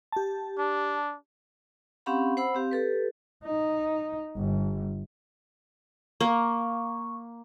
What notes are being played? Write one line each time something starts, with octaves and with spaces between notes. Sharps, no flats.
G4 A5
D4
C4 C#4 G4 F5 F#5 B5
C5 F#5 B5 E6
C4 G4 F5
G4 A4 B4
D#4
G1
A#3 C#6